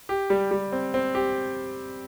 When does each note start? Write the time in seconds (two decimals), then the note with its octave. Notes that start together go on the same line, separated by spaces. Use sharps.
0.09 G4
0.30 G3
0.51 G3
0.72 C4
0.94 C4
1.15 G4